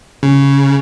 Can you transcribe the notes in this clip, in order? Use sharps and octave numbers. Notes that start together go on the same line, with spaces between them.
C#3